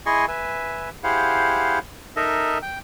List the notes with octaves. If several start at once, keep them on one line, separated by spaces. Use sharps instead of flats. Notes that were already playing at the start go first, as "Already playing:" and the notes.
E4 G#4 D#5 G#5 C6 C#6
B4 E5 G#5
E4 G4 G#4 C5 F5 F#5
D#4 A4 A#4 D#5 E5
G5